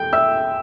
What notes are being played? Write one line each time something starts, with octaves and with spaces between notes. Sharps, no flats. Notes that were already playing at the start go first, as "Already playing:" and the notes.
Already playing: G5 G6
E5 E6